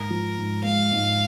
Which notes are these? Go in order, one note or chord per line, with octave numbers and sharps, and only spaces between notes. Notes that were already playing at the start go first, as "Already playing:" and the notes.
Already playing: G#2 A#4
F3
G#2
G#3 F5
G#2